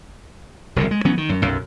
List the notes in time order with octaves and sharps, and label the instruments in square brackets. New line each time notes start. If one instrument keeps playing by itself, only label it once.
[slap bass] E1 C2 D3
G#3
E3 F#3 B3 C#4
D#3
F#2
B1 F#2